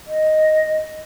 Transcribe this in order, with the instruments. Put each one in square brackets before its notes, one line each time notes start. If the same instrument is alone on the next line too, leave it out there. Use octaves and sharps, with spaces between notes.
[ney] D#5